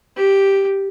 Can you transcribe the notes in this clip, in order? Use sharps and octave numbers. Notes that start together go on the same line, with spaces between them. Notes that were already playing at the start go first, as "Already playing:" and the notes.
G4